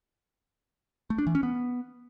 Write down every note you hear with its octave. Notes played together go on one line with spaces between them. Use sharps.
A3
D4
E3
C#4
B3